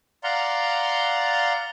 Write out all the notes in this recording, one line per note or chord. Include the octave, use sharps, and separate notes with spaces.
D5 F5 F#5 A#5 C6